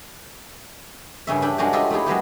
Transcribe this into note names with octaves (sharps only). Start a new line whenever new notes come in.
G2 C#3 C#4 E5
D4 E5 G5
G#3 C#4 D4 F#4 G4
F4 G4 A4 C5 D#5 E5
A3 D#4 E4 G4 G#4
F#3 G#3 B3 G4